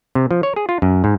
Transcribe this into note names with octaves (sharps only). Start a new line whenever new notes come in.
C3
F3
C#5
G#4
F4
F#2
G#2